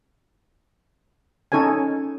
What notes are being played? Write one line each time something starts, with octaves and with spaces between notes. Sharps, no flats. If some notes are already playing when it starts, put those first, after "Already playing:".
C#4 D#4 A4 C#5 G#5